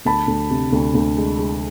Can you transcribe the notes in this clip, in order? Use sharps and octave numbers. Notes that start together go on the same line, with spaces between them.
D2 A5 B5
D2
C3
D2
D2
G#3
G#3